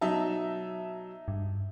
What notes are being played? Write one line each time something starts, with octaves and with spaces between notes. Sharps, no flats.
B2 F#3 D#4 E5 A5
G2